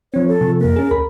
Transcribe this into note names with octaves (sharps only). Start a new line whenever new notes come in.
F3 C4 C#5
A4
C3 F3
F2 A#3 A#4
C#4 G#4
D2 A#4 B5